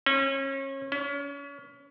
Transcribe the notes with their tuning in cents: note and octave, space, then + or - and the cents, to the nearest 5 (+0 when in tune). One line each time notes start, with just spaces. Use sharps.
C#4 -30
C#4 +35